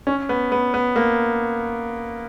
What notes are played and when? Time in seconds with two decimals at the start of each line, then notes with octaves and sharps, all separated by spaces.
0.07 C#4
0.29 B3
0.52 B3
0.74 B3
0.96 A#3